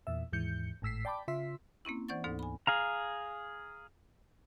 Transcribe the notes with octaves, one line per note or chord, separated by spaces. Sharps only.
E2 A#2 E5
D#2 G#2 E3 G6 C#7
G#1 A2 E6 B6 C7
D5 G5 A5 B5 D6
C#3 F4 E5 C6 B6
A#3 C4 C#4 E4
E3 C5 D5 F#5 C#6 A6
D2 G#2 B3 D#4 A4
G#5 B5
G#4 F5 A#5